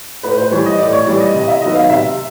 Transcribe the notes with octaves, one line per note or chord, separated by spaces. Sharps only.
A2 B4
C5
E3 G3 C#5
D#5
A2 D5
C#5
E3 G3 D5
D#5
C3 D#5
E5
D#3 F#3 B3 D#5
F5
C3 E5